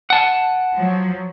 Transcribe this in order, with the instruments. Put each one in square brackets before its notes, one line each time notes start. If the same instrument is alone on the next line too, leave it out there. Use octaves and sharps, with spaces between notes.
[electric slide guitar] F#5 A5
[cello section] F3 F#3